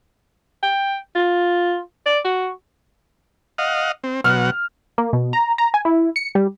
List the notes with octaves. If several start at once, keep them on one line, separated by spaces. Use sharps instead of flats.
G5
F4
D5
F#4
D#5 F5 F#5
C4
B2 F#3 F#5 F6
A#3
B2
A#5
A#5
G#5
E4
C#7
G3